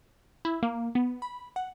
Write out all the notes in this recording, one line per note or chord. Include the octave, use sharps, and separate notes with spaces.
E4
A#3
B3
B5
F#5